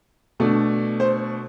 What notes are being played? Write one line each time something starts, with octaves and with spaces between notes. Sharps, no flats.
B2 A3 D4
C5